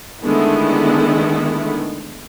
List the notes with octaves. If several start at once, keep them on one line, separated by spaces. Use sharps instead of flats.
D3 D#3 G#3 A3 B3 E4